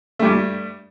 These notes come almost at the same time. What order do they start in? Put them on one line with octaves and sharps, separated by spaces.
A3 G3 G2